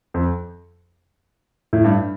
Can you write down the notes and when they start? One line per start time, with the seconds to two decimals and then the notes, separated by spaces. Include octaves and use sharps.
0.14 F2
1.73 A2
1.84 G2